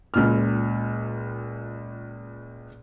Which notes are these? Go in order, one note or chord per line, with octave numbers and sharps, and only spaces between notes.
C#2 A#2 F6